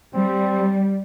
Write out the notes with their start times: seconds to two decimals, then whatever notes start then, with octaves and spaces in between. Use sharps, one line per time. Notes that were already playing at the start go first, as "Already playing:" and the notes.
0.15 G3 C4